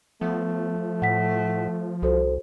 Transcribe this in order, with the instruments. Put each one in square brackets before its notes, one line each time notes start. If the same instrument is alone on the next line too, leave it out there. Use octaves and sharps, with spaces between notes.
[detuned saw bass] F3 [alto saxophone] A3 [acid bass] B3
[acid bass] A2 [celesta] F#5 B6
[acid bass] C2 [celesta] F#4 A4 C5